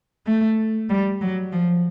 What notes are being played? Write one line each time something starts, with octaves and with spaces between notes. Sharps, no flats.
A3
G3
F#3
F3